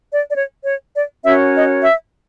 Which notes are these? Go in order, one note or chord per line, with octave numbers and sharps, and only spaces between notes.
D5
D5
C#5
C#5
D5
C#4 F#4 A#4 C#5 E5
D#5
E5